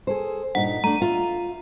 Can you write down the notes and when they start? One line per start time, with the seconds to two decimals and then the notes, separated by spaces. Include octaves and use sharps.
0.07 G#4 A4 C5
0.55 G2 A#2 D#4 F#5
0.84 A3 D4 A#5
1.00 F4 E5